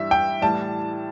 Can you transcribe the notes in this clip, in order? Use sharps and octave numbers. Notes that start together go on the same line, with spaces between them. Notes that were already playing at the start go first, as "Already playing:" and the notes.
Already playing: G2 E3 G3 E5
G5
A2 E3 G3 A5